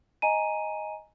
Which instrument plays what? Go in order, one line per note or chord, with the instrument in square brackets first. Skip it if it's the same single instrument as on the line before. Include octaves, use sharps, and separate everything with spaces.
[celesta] D#5 G#5 A#5 D#7